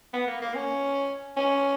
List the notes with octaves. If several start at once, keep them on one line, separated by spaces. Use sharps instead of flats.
B3
A#3
A#3
C#4
C#4